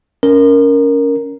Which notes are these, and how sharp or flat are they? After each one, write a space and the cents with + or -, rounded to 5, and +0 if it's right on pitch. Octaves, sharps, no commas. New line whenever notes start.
C#4 +20 A#4 +0